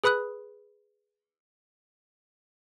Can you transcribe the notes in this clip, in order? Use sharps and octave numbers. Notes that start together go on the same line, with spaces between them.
G#4 B4 B5 D#6 F#6